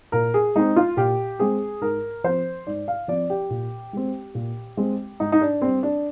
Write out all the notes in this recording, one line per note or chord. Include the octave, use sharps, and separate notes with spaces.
A#2 A#4
G#4
G#3 C4 D#4
F4
A#2 G4
G#3 C4 G#4
G#2 A#4
F3 C4 C5
G#2 D5
F5
F3 C4 D5
G4
A#2
G#3 C4
A#2
G#3 C4
G#2 D#4
D#4
D4
G3 C4
D4